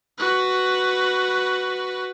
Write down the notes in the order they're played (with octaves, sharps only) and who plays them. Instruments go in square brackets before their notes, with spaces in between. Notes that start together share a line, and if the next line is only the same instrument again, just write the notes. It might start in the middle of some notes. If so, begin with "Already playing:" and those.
[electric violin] F#4 B4